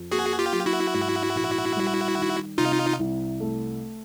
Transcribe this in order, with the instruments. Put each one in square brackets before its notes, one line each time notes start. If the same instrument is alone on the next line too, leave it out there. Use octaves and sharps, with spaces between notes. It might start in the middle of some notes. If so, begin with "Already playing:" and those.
Already playing: [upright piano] F2
[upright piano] A#3 [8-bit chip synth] F#4 G#4
[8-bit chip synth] F4 G4
[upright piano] F#3
[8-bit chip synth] E4 F#4
[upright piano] G#2
A#1
G3
D#3
[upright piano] C3 [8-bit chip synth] D#4 F4
[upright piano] C2
A3